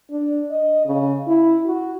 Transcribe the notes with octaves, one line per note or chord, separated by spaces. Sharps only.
D4
D#5
C#3
E4
F#4